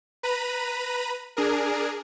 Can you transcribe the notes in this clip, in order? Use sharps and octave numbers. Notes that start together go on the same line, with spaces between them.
B4 A#5 B5 D#7
D4 G#4 A#4